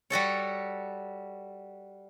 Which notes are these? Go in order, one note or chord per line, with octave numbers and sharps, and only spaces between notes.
G3 F#4 A4 C#5